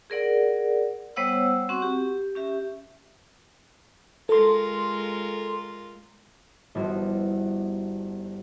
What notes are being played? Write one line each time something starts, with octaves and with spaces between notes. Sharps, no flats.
G#4 A#4 D5 F#5
G3 B3 C5 C#5 F#5 E6
C4 F#4 F#5 C#6
G4
C#4 G4 E5
G#3 F4 A4 A#4 C6
G1 F3 B3 E4 F#4 C5